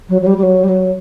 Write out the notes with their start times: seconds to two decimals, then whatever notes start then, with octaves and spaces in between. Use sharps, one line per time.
0.09 F#3
0.21 F#3
0.27 G3
0.37 G3
0.43 F#3
0.64 G3
0.69 F#3